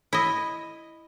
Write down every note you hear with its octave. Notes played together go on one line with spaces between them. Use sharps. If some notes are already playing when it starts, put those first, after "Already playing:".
E4 D#5